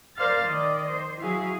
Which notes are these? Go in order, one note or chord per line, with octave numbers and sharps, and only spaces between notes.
A#4 C5 D5 F5 F6 A6
D#3 D5 D#5
C5
F#3 E4 F#4 G#4 F5